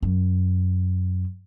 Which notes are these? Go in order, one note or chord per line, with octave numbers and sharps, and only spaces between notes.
F#2